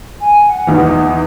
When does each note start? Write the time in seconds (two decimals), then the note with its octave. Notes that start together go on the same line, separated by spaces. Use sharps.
0.20 G#5
0.47 F#5
0.67 E2 E3 D#4